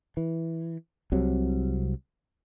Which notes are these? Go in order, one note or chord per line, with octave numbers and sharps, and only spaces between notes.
E3
C2 C3 F#3